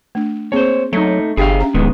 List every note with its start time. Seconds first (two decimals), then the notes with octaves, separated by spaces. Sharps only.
0.15 A3 D4
0.52 A#3 C4 G#4 C5 C#5
0.93 F#3 A3 D#4
1.37 G1 D4 G4 G#4 E5 F5 G5
1.60 C#4 A#5
1.74 D1 D#3 G#3 B3